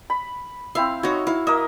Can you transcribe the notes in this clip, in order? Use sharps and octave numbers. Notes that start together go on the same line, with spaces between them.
B5
C4 E4 E5 F5
D#4 F#4 C#5
E4 F5
A#3 D#5 E5